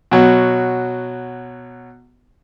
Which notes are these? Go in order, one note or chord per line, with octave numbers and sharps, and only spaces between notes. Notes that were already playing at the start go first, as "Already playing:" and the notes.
B2 F#3